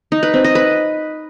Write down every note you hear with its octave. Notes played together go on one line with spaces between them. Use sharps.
D#4
B4
C4
D#5
B4